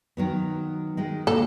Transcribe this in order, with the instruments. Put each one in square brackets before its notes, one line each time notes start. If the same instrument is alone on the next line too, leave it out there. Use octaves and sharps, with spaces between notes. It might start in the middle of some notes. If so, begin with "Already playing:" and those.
[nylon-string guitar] D#3 F#3 B3
D#3 G#3
[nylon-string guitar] A#2 D3 [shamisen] A4